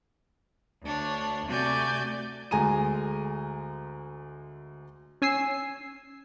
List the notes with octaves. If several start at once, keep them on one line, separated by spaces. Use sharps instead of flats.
D2 D4 C#5
C3 A3 F#4 D5 G#5 G6
D2 G#3 G#5 A#5 D#7
C#4 G#5 E6 C7